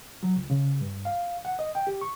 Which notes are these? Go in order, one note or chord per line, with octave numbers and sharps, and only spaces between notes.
F#3
C#2
C#3
G2
F5
F#5
D#5
G5
G4
C#6